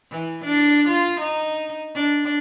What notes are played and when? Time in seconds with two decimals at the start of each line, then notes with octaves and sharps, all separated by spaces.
0.11 E3
0.44 D4
0.88 F4
1.20 D#4
1.94 D4